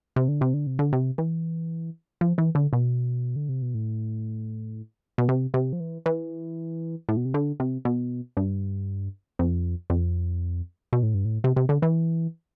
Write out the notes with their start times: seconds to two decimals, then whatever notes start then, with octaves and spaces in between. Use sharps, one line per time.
0.16 C3
0.28 D3
0.41 C3
0.54 D3
0.67 C3
0.79 D3
0.93 C3
1.18 E3
2.21 F3
2.38 E3
2.55 D3
2.73 B2
3.36 D3
3.49 C3
3.62 B2
3.74 A2
5.18 B2
5.29 C3
5.54 C3
5.73 F3
5.80 E3
6.06 E3
7.09 A2
7.17 B2
7.25 C3
7.34 D3
7.60 C3
7.85 B2
8.37 G2
9.39 F2
9.90 F2
10.93 B2
11.03 A2
11.14 G2
11.25 A2
11.44 C3
11.56 C3
11.69 D3
11.82 E3